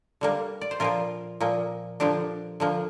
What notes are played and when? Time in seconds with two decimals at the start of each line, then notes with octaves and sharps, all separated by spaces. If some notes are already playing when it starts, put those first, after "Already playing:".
0.21 D3 G3 A#3
0.61 D5
0.71 C5
0.80 A#2 F3 A#3 F4 A#4
1.40 A#2 F3 A#3
2.00 D3 F3 A#3 D4 G4
2.60 D3 F3 A#3